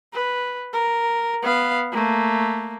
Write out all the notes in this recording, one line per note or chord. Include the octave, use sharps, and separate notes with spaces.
B4
A#4
B3 F5
A3 A#3